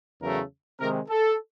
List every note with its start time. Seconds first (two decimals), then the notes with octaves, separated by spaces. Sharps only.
0.20 E2 C#3 F#3 A3 A#4
0.79 C3 D#3 G#3 A#4
1.08 A4